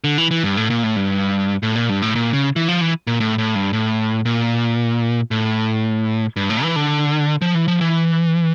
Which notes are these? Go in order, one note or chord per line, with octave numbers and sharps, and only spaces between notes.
D3
E3
E3
G2
A2
A#2
A2
G2
A2
A#2
G2
A2
A#2
C#3
E3
F3
E3
A#2
A2
A2
G2
A2
A#2
A2
G2
A2
E3
D3
F3
E3
F3
E3